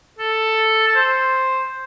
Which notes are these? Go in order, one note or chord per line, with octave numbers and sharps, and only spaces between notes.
A4
A4
C5